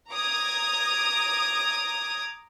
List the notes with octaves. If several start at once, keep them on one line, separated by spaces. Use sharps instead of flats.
A#5 D6 D#6 G#6